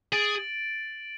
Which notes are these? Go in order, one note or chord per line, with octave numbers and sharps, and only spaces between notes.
G#4 A6 D7 F#7